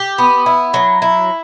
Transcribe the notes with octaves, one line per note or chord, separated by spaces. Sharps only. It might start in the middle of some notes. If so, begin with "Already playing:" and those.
Already playing: G4
B3
E4
F#3
E4